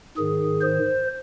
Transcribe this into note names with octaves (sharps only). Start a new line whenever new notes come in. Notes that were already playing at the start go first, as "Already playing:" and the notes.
G#2 D#3 G#4
C5